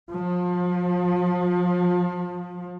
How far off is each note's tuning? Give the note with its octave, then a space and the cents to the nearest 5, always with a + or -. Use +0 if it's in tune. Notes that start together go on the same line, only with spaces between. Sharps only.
F3 +30